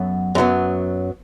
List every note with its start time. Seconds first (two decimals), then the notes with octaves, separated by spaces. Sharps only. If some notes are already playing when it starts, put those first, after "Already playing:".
Already playing: F#2 F#3 B3 A4
0.35 F#2 F#3 B3